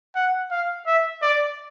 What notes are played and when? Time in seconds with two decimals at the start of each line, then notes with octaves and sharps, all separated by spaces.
0.16 F#5
0.51 F5
0.87 E5
1.23 D5